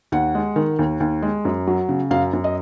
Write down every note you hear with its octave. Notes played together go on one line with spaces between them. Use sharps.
D#2 F#5
G#3
D#3
D#2
D#2
G#3
F#2
F#3
C#3
F#2 F5
F#2
D#5